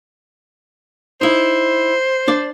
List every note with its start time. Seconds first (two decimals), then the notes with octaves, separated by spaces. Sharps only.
1.21 D#4 E4 C5
2.28 D4 D5